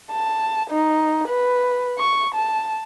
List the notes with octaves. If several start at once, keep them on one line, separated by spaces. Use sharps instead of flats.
A5
D#4
B4
C#6
A5